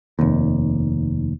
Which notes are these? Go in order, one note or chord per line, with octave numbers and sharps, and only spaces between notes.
F1 D#2